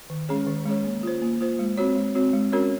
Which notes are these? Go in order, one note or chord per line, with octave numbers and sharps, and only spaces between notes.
D#3
G#3 C#4 G#4 C#5
D#3
G#3 C#4 G#4 C#5
A#3
F4 C5
A#3
F4 C5
G#3
C4 F#4 C#5
G#3
C4 F#4 C#5
G#3
C#4 F#4 A#4 C#5